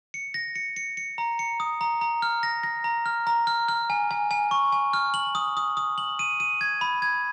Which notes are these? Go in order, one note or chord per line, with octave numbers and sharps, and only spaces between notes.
C#7
A#6
C#7
C#7
C#7
A#5
C#7
D#6
A#5
A#5
F6
A#6
A#6
A#5
F6
A#5
F6
F6
G#5
G#5
G#5
C#6
G#5
F6
F#7
D#6
D#6
D#6
F#7
D#7
D#7
G#6
B5
G#6